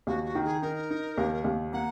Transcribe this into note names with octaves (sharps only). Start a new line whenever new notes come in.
D#2 F#4
F#4
D#3
G#4
D#4 A#4
D#4
D#2
D#2
A#3 F#5